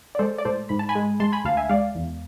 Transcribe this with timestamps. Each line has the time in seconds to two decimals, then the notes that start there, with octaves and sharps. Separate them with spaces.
0.15 D5
0.19 G#3 A4 C5
0.38 D5
0.45 A2 A4 C5
0.69 G#2 B5
0.79 A5
0.89 G#5 B5
0.95 G#3
1.20 G#3 A5 C6
1.32 G#5 B5
1.44 D2 F5 A5
1.57 E5 G#5
1.69 G#3 D5 F5
1.95 E2